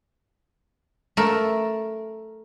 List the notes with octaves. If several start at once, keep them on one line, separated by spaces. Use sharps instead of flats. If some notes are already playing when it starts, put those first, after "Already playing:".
A3 A#4